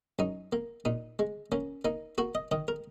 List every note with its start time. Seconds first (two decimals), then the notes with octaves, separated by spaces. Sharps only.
0.19 F#2 D#4
0.53 A#3
0.85 A#2 D#4
1.19 G#3
1.52 A#3 C#4
1.85 A#3 D#4
2.18 A#3 F#4
2.35 D#5
2.51 D#3 D#5
2.68 A#4